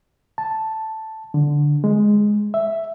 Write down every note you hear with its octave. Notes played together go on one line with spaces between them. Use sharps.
A5
D3
G#3
E5